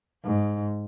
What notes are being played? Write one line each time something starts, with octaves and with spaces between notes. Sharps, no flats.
G#2